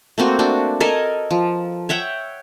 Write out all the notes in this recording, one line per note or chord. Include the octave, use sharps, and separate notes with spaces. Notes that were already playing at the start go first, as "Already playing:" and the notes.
A3 A#3 C4 F#4
D4 F#4
A4 A#4 D#5 G#5
F3
C#5 E5 F#5 G5